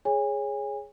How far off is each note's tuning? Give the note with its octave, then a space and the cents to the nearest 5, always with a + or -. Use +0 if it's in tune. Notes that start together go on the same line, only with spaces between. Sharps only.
G#4 +0 C#5 +0 G#5 -30